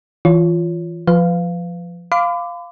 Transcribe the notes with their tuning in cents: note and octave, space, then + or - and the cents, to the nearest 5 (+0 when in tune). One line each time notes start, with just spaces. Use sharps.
E3 +0 F4 +0 C#5 +25
F3 +0 B4 +25 F5 +0
F5 +0 B5 +45 D6 +0